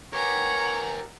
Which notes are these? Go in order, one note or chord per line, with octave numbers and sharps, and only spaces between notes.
G4 A#4 B4 C#5 F#5 G#5 A#5